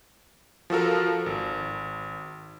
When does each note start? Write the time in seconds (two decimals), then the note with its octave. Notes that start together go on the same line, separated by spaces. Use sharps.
0.70 F3 F#4 A4 A#4
1.26 G#1